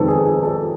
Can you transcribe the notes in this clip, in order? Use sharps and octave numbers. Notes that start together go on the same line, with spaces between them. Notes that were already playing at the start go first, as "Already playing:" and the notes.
Already playing: F2 C3 D#3 G#3 B3 A4
G#4
G#4
A4